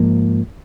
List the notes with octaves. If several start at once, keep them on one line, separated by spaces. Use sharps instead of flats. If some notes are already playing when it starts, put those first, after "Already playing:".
Already playing: G#2 F3 A#3